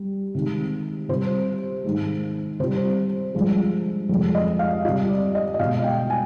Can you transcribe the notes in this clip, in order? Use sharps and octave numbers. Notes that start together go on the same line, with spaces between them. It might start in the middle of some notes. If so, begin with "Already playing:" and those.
Already playing: G3
C3 D#3 G#3
C3 G3 C5
G#2 D#3 G#3
C3 G3 C5
G2 F3 G#3
F2 C3 F3 G#3
D#5
F5
C3 G3 D#5
D5
D#5
D#5
B2 G#3 F5
G5
G#5